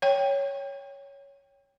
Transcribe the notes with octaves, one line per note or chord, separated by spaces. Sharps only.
C#5 G5